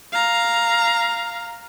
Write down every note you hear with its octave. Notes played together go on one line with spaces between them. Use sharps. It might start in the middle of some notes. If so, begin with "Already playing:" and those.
F5 A#5